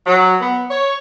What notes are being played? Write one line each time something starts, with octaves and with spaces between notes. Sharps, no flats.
F#3
B3
C#5